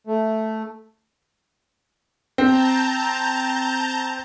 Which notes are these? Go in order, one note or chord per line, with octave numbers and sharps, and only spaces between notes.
A3
C4 A5 A#5 G6